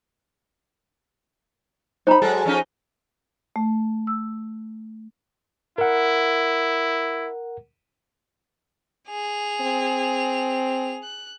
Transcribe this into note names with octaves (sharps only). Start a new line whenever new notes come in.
D#4 C5 A#5 B5
F#3 G#3 A4
F3 C#4 D#4
A3
E6
E4 A#4 F#5
G#4 F7
C4
F#6